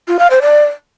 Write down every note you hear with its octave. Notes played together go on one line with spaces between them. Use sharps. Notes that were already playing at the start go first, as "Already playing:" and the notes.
F4
F5
C5
D5